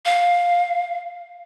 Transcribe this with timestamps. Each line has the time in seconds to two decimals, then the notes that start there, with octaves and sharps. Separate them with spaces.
0.05 F5